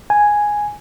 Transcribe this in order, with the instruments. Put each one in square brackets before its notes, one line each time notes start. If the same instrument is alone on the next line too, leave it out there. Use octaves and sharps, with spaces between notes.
[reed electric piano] G#5